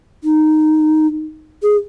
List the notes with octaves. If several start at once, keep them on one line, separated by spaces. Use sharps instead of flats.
D#4
G#4